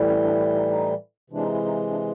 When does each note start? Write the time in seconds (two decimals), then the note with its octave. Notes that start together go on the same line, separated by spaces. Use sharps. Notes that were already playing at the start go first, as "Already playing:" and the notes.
Already playing: A2 E3 G3
0.09 C#4
0.24 D4
0.40 E4
0.55 D#4
0.70 D#4
1.30 C3 E3 G#3 D4
1.42 D#4
1.54 E4
1.65 D#4
1.91 D4